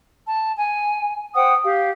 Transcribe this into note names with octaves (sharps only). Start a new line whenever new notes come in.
A5
G#5
C5 F#5 G5 D#6
G4 F5